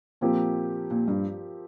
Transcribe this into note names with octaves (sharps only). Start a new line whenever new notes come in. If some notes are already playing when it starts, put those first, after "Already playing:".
A#2 F3 C4 G4 A#4
A#2
G2